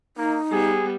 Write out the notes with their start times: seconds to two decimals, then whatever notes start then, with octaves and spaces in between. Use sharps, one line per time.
0.17 A#3 D#4
0.52 G3 B3 G#4